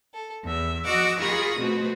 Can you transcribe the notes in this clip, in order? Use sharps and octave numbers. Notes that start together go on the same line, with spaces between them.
A4
E2 E5
F3 F#4 D#5 F#5 D6 E6
F4 G#4 A#4 B5 C#6 D#6
B2 A3 C4 F#4 B4